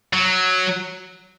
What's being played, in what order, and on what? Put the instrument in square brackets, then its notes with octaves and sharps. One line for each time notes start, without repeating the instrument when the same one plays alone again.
[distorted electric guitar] F#3